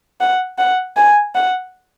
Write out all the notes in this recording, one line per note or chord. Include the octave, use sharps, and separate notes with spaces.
F#5
F#5
G#5
F#5